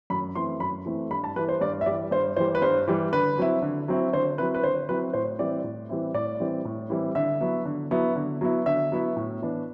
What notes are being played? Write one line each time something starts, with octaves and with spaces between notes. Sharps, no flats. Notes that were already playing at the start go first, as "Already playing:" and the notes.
F#2 B5
E3 A3 C4 E4 C6
F#2 B5
E3 A3 C4 E4
G2 B5
A5
E3 G3 B4
C5
G2 D5
E5
E3 G3 D5
G2 C5
E3 G3 C5
B4
G2 C5
E3 G3
D3 B4
F#3 C4 E4
D3
F#3 C4 E4
D3 C5
F#3 C4 E4 B4
B4
D3 C5
F#3 C4 E4 B4
A2 C5
E3 G3 C4 E4 D5
A2
E3 G3 C4 E4
A2 D5
E3 G3 C4 E4
A2
E3 G3 C4 E4
D3 E5
F#3 B3 E4
D3
F#3 B3 E4
D3
F#3 B3 E4
D3 E5
F#3 B3 E4
A2
E3 B3 D4